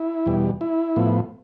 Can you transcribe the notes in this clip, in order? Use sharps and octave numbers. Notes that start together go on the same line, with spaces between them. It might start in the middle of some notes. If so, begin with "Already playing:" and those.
Already playing: E4
E2 B2 G3
E4
A2 F3 B3